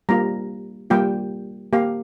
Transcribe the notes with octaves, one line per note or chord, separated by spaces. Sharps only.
G3 A#3 F4 A#5
G3 A#3 F4 G5
A#3 G4 F5